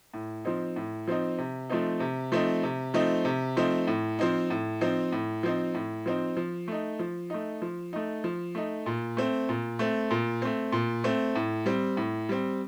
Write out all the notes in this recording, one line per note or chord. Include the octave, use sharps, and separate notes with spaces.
A2
F3 C4 D#4
A2
F3 C4 D#4
C3
F3 A3 C4 D#4
C3
F3 A3 C4 D#4
C3
F3 A3 C4 D#4
C3
F3 A3 C4 D#4
A2
F3 C4 D#4
A2
F3 C4 D#4
A2
F3 C4 D#4
A2
F3 C4 D#4
F3
A3 D#4
F3
A3 D#4
F3
A3 D#4
F3
A3 D#4
A#2
A3 C4
A#2
A3 C4
A#2
A3 C4
A#2
A3 C4
A2
G3 C4
A2
G3 C4